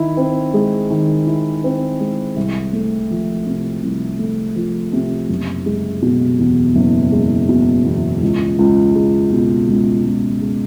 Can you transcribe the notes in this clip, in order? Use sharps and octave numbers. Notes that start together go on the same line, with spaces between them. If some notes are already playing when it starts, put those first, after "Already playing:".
Already playing: D#3 E4
C4
G#3
D#3
E4
C4
G#3
C2
A3
F3
C3
C2
A3
F3
C3
F#1
G#3
B2
E2
F#1
G#3
B2
E2
C#2
C#2
G#3
B2
C#2
C#2
G#3